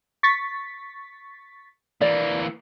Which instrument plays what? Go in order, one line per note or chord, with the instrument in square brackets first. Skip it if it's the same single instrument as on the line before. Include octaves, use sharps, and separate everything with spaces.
[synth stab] C#6 A6 B6
[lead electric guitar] E3 A#3 [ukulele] D5